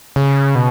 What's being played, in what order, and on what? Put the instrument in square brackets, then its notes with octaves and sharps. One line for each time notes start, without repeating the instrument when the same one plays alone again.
[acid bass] C#3
B2